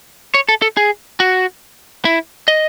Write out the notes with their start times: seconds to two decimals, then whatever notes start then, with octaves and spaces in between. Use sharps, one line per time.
0.34 C#5
0.49 A4
0.62 A4
0.77 G#4
1.20 F#4
2.05 E4
2.48 D#5